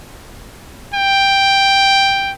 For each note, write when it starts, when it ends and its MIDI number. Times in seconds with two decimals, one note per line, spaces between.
0.94 2.32 79